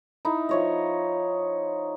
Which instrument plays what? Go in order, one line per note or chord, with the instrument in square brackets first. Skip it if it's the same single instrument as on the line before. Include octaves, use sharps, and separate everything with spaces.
[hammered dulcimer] D#4 E4 E5
F3 C#5 D#5